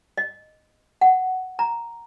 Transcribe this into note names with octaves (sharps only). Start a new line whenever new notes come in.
D#5
F#5
A#5